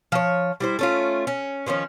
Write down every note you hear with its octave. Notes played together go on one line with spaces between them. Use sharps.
F3 C#5
G3 E4 C5
A3 C#4 F4
C#4
D#3 F3 C4 C#4